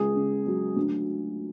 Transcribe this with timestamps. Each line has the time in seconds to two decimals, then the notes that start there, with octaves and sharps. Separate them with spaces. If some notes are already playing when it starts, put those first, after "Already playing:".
Already playing: C#2 G#4
0.15 C#3
0.46 F#3
0.76 D2